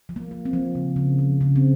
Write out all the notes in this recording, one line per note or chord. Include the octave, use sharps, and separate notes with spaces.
F3
A#3
A#3
C4
F3
C#3
C#3
F3
C#3
C4